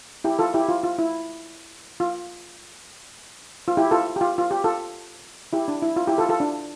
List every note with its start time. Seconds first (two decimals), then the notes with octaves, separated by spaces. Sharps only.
0.24 E4 G4
0.39 F4 A4
0.54 E4 G4
0.69 F4
0.84 F4
0.99 E4
2.00 F4
3.68 F4
3.77 E4 G4
3.91 F4 A4
4.16 G4
4.21 F4
4.38 F4
4.51 G4
4.64 F4 A4
5.53 E4 G4
5.68 D4
5.82 E4
5.96 F4
6.07 E4 G4
6.18 F4 A4
6.29 F4 A4
6.40 D4